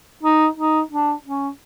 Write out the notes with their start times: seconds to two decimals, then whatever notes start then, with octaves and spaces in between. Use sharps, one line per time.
0.23 D#4
0.57 D#4
0.91 D4
1.25 C#4